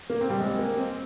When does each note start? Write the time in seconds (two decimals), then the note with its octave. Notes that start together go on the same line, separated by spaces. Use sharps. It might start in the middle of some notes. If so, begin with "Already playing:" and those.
0.10 A#3
0.21 C4
0.30 G3
0.40 G#3
0.59 A#3
0.77 C4